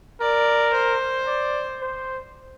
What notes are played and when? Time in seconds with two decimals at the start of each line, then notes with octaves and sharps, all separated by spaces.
0.21 A#4 D5
0.74 C5
1.27 D5
1.81 C5